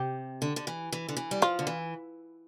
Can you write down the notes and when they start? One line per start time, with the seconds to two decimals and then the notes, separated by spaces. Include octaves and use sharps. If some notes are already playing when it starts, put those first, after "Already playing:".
Already playing: C3 G4
0.42 D3
0.56 D3
0.67 E3
0.92 E3
1.09 D3
1.17 E3
1.31 G3
1.42 F3 F4
1.59 D3
1.67 E3